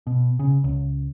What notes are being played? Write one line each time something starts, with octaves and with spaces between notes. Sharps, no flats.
B2
C#3
C#2